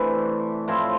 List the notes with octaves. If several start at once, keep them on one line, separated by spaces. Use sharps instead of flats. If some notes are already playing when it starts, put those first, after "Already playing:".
Already playing: C3 E3 A3 D4
A2 F3 C4 E4